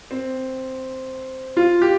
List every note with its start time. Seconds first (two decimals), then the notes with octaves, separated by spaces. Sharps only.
0.11 C4
1.57 F4
1.82 G4